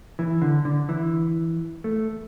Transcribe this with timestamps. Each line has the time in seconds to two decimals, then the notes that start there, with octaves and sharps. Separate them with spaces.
0.19 E3
0.42 D3
0.65 D3
0.89 E3
1.84 A3